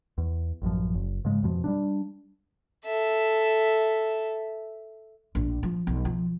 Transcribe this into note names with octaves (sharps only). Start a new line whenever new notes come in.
E2
A1 F#2 F3
F#1
G#2 C#3 G#3
F2 B2 F3
G3 A#3 D4
A4 E5
A#1
F3
B1
F3